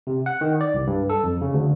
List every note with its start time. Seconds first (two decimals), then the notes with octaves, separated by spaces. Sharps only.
0.07 C3
0.26 F#5
0.41 D#3
0.61 D5
0.74 C2
0.87 G2
1.09 A4
1.24 F2
1.41 C#3
1.54 D2